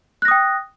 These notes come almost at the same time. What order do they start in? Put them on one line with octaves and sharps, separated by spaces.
F#6 A#6 D#6 G5